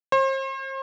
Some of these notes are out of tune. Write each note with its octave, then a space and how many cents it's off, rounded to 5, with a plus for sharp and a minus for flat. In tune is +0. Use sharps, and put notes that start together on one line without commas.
C5 +40